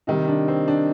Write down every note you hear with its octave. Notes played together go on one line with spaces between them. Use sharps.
C3 D#3 G3 D#4
D4
C4
D4